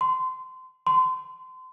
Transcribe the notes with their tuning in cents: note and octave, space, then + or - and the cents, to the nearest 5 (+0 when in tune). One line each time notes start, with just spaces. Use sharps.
C6 -25
C6 -30